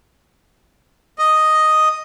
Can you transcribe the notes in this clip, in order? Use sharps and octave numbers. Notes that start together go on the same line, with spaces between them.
D#5